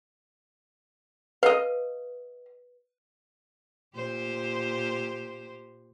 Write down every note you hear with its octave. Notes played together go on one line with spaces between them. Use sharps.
B4 D#5 F5
A#2 G4 C5